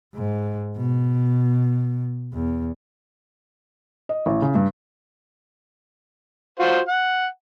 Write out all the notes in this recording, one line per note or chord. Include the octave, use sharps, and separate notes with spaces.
G#2
B2
E2
D#5
A1
C#3
G2
F4 F#4 C5
F#5